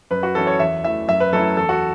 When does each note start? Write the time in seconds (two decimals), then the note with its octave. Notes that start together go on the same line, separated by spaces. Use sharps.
0.11 F#2 B4
0.23 F#4
0.35 E3 C#4 E4 A4
0.47 C#5
0.60 E2 E5
0.84 E3 A3 E5
1.08 F#2 E5
1.20 B4
1.33 F#3 A3 C#4 E4 A4
1.57 E2 A4
1.69 F#4